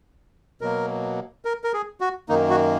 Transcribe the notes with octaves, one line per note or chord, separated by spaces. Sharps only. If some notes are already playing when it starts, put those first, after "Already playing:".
B2 F#3 A#3 A#4
A#4
A#4
G#4
F#4
F#2 D#3 A#3 D#4
F#4